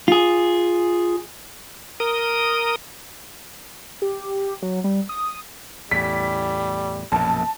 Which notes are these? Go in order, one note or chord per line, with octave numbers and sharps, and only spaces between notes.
F4 G#4
A#4 D#6
G4
F#3
G3
D#6
E2 A2 G3 B6
A#1 F#2 B2 A5